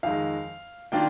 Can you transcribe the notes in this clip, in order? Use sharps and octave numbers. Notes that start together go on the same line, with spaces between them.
F2 D#3 G#3 F5
D#3 A#3 D4 F4 G5